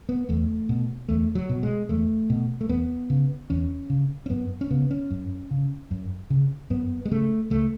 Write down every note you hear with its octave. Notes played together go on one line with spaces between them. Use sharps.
B3
E2 A3
B2
E2 A3
F#3
B2
G#3
E2 A3
B2
A3
E2 B3
C#3
E2 C#4
C#3
C#4
F#2 B3
C#4
C#3 B3
C#4
F#2
C#3
F#2
C#3
F#2 B3
G#3
C#3 A3
C#2 A3